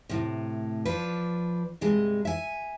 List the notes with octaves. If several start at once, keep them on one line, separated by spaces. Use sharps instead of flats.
A2 C3
F3 D4 B4
G2 C3 G#3
E5 G#5